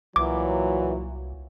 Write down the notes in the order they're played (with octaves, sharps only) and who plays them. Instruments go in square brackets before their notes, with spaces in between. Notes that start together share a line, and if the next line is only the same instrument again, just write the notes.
[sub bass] C2 [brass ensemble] A#2 F#3 [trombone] E3 [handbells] D6